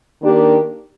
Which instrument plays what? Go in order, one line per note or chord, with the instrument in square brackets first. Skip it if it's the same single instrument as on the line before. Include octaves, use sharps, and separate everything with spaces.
[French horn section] D#3 A#3 D4 G4